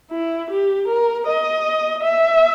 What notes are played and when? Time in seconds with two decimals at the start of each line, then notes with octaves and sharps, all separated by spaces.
0.11 E4
0.51 G4
0.88 A#4
1.27 D#5
2.03 E5